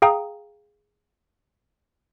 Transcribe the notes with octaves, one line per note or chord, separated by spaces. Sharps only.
G#4 F5 G5 A#5 D#6